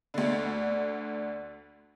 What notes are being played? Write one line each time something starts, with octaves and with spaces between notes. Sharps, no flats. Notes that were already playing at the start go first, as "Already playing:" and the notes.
D2 D3